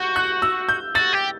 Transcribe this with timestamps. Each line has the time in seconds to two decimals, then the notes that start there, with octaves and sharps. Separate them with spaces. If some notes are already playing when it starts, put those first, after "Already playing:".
Already playing: F#4 G6
0.16 F#6
0.42 E6
0.69 G6
0.95 F#4 A6
1.13 G4